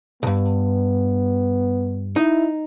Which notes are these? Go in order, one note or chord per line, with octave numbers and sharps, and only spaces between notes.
B1 G2 B3
D#4 E4